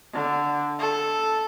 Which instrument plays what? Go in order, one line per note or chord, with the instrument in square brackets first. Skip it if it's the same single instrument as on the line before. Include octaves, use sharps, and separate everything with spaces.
[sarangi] D3
A4